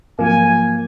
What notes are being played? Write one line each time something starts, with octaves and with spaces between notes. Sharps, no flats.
G#2 F3 F#3 A#3 G#5